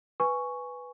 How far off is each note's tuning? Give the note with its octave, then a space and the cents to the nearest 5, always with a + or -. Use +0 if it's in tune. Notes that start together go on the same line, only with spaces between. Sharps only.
B4 +0 G#5 +0 C#6 +0